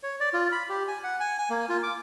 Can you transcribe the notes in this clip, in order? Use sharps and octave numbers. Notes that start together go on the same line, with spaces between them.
C#5
D5
F4
B5
G4
G#5
F#5
G#5
G#5
A#3
F4
D6